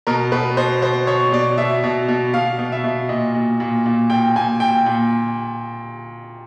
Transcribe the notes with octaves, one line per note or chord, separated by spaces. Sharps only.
B2 A#4
B2 B4
B2 C5
B2 C5
B2 C#5
B2 D5
B2 E5
B2
B2
B2 F5
B2
E5
B2
A#2 D#5
A#2
A#2
A#2
A#2 G5
A#2 G#5
A#2 G5
A#2